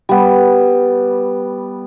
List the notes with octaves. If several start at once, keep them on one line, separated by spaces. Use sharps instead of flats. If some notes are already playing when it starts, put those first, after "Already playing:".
G3 B3